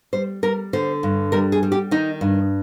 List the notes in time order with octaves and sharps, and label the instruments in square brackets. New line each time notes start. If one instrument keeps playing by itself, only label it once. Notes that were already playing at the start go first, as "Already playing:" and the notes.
[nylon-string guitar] G3 C5
G3 A#4
D3 C5
G2
G3 A#4
G#4
G3
G4
D#3 D#4
G2